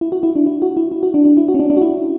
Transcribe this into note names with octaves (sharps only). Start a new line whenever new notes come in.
E4
F#4
E4
D4
E4
F#4
E4
E4
F#4
D4
D4
E4
F#4
C#4
D4
D4
F#4
E4